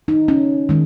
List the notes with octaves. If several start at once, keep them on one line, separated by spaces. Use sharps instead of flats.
D#4
C#4
D#3 G#3